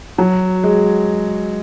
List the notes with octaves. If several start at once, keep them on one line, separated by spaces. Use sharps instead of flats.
F#3
G#3